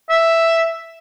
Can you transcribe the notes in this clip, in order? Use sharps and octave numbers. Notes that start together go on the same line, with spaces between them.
E5